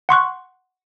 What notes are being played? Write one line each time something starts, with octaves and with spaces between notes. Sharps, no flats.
F#5 C6 C#6 F#6